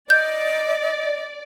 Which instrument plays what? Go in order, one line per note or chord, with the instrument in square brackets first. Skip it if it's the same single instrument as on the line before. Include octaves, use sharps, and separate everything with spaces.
[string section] D5 [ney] D#5 [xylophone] G6